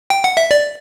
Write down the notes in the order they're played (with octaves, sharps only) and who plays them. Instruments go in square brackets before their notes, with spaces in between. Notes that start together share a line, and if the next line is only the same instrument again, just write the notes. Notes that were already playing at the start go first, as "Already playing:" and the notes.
[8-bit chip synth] G5
F#5
E5
D5